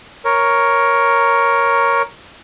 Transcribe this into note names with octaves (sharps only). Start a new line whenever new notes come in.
A#4 C#5